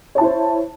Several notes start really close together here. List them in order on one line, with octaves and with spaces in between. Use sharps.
C#5 A5 E4 C5